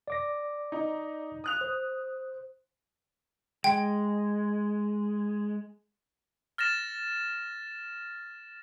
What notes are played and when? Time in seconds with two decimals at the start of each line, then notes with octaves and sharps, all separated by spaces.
0.08 D5 D6 A#6
0.72 D#4
1.44 D#6 F#6 F7
1.61 C5
3.64 G#3 G5
6.58 F6 A6 A#6 E7